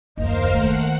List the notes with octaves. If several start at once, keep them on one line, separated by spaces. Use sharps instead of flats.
F#1 D#2 A#4 C5 D#5 F5
D#3 A3 A#3 F#5